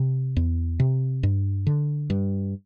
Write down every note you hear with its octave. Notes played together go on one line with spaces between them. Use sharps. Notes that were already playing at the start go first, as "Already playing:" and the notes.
Already playing: C3
E2
C3
G2
D3
G2